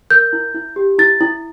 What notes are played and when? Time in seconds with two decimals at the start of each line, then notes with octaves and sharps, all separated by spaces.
0.11 A#4 G6
0.33 E4
0.55 E4
0.76 G4
0.99 E4 A6
1.21 E4